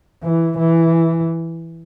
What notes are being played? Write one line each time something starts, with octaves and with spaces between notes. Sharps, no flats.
E3
E3